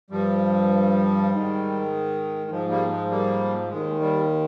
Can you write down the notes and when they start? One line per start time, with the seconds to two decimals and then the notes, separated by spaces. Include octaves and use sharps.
0.10 G2 F3 G3
1.31 G#2 D#3
2.50 G#2 F3 G#3
2.70 G3 A#3
2.90 G#3
3.10 G3 A#3
3.70 D#2 D#3 G#3
4.00 G3